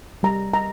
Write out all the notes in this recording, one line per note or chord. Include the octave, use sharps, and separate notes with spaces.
G3 A#5
A#5